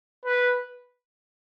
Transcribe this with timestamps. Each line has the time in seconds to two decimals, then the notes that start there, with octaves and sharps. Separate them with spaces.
0.25 B4